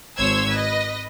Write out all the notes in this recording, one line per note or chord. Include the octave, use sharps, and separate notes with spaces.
G#1 C5 C#5 E6 G#6
B4 D#5